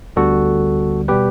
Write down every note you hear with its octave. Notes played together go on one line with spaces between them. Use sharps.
D2 D3 G3 B3 F#4 A4
B2 G3 B3 G4 B4